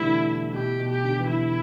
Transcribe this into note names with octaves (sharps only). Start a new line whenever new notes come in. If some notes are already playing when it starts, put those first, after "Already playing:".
Already playing: B2 D3 E3 G3 A3 E4
B2 G4
B2
G4
D3
E3
G3 E4